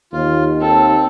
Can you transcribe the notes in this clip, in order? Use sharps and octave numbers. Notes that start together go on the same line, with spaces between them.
D#2 F4
C4 A4